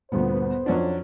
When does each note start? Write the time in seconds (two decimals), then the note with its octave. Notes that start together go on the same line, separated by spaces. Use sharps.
0.12 D2 G2 A#2 B3 C5
0.66 F2 F#3 C#4 D4 F4